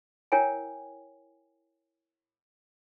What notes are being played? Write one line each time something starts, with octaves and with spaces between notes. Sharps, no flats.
E4 A#4 C#5 F5 G5 G#5